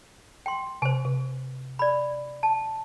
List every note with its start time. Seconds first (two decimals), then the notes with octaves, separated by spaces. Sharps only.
0.46 G5 C6
0.82 C3 C5 G#5
1.05 C3
1.79 D5 B5
2.43 A5